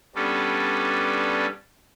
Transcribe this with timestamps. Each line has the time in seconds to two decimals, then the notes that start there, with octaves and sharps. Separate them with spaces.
0.15 G3 B3 C#4 D4 A4